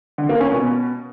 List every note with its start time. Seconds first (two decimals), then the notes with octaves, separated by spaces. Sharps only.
0.18 D3
0.29 A#3
0.41 C#4
0.52 B2